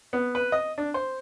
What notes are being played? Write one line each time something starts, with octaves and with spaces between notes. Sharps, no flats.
B3
B4
D#5
D4
C5